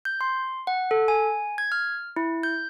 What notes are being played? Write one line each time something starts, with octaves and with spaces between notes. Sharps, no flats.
G6
C6
F#5
A4
G#5
G#6
F6
E4
G6